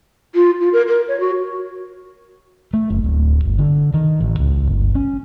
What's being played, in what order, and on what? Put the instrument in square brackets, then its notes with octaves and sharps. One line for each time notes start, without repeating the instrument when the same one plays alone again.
[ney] F4
F4
A#4
A#4
C#5
F#4
[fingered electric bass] A3
F#1
D1
G1
D3
D#3
A1
C#2
G1
C#4